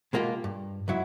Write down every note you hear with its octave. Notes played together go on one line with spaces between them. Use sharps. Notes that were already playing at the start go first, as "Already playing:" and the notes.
B2 G#3 A#3 F4 G4
G2
C#2 F#2 F#3 E4